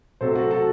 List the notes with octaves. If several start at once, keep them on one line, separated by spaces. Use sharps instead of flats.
C3 F#3 A3 A4 C5
F#4 A4
F#4 A4